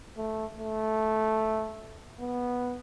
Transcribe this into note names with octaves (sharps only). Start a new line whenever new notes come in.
A3
A3
B3